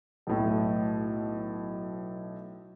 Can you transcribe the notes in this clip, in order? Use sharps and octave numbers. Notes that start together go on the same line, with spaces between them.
B1 A2